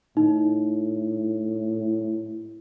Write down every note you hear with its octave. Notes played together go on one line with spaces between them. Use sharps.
A2 D#4